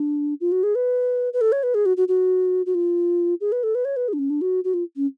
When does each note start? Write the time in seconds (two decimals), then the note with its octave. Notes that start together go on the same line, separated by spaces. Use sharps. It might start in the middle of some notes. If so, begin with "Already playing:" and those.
Already playing: D4
0.41 F4
0.52 F#4
0.63 G#4
0.75 B4
1.33 B4
1.41 A4
1.52 C#5
1.63 B4
1.75 G#4
1.86 F#4
1.97 F#4
2.08 F#4
2.66 F#4
2.75 F4
3.41 G#4
3.52 B4
3.63 A4
3.75 B4
3.85 C#5
3.97 B4
4.08 G#4
4.13 D4
4.19 C#4
4.30 D4
4.41 F#4
4.64 F#4
4.74 F4
4.97 C#4